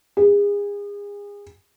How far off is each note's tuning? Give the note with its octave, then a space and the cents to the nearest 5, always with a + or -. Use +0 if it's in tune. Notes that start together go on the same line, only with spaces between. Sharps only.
G#4 -35